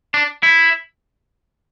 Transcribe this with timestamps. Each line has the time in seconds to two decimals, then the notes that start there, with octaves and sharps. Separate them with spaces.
0.14 D4
0.43 E4